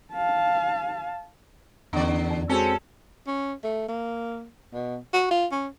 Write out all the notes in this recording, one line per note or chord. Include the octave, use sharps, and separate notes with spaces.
F5 A5
E2 D3 B3 C#4 D5
F2
G#3 C4 C#4 F#4 G#4 A4
C#4
A3
A#3
B2
F#4
F4
C#4